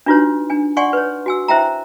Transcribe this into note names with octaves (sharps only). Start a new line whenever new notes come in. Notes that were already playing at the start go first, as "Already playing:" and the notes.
D4 D#4 F4 F#4 B4 C#5
D4 G#5
D5 F#5 G#5 C6 C#6
B4 C#5
F#4 G#5 E6
E4 C5 E5 G5 A#5